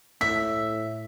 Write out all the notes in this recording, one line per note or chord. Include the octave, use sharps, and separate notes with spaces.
A2 E5 B6